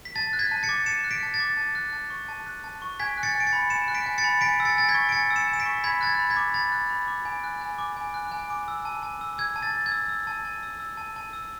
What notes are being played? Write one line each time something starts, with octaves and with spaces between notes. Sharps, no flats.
B6
A5 A6
F#6
G#6 B6
A5
A6 C#7
D6
A5 C#7 E7
F#6
B6 D7
A5
A6
D6
A5
F#6
A5
C#6
A5
F#6
A5
C#6
G#5 G#6 B6
F#6
A6 C#7
G#5
D7
A6 C#7
B5
G#5 C#7 E7
F#6
B6 D7
G#5
A6 C#7
B5
G#5 B6 D7
E6
A6 C#7
G#5 A6
G#6 B6
C#6
D7
G#5 A6 C#7
E6
C#7 E7
G#5
E7
B6 D7
C#6
B5 G#6 B6
F#6 A6
G#6
B5
G#6 B6
D6
B5 A6
F#6
B5
D6
G#5
F#6
G#5
D6
G#5
F#6
G#5
D6
E6
A5
A5
E6
E6 G#6
A5
A6
A5
G#6
E6
E6
A5
A5
E6
E6
A5
A5
E6